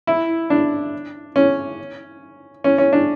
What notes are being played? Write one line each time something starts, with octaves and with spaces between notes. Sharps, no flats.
E4
D4
C#4
C#4
C#4
D4